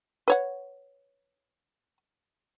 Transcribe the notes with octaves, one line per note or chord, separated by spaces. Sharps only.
B4 C#5 F#5